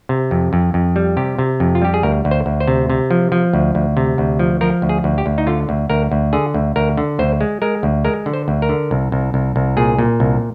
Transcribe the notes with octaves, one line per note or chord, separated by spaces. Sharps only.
C3
F2
F2
F2
G3
C3 G4
C3
F2
F4
G3 G4
G#4
D2 A#4
D2
C5
D2
C5
C3
C3
F3
F3
D2
D2
C3
D2
F3
F3 A#4
D2
G#4
D2
G4
D2
D#4
D3 F4
D2
D2 A#4
D2
D3 G#4
D2
D2 A#4
D3
D2 C5
G#3
G#3 A#4
D2
G#3 A#4
D3
C5
D2
A#4
D3
C2
C2
C2
C2
A#2 G#4
A#2
C2